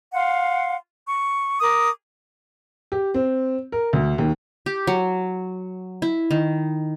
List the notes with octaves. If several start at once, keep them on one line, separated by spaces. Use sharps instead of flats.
F5 F#5 C6
C#6
A#4 D6 D#6
G4
C4
A#4
D2
D#2
G4
F#3
E4
D#3